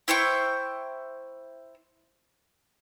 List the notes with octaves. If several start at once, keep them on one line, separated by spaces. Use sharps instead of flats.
E4 C5 G5 C#6